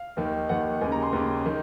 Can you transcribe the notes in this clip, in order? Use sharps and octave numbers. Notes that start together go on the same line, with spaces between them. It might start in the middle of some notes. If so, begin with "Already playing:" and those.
Already playing: F5
D#2 D#3
D#2 D#3 F#5
D#2 C#3 G#5
A#5
C6
D#2 C#3
D#3